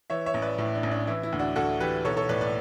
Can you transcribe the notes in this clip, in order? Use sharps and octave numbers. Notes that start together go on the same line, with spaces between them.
E3 C#5 E5
C#5 E5
A1
B4 D5
A2 E4
D4
A1
D4
E3 E4
E4
D2
D4 F#4
D2 F#4 A4
E3 G4 B4
B1 A4 C#5
A4 C#5
A2 B4 D5
B4 D5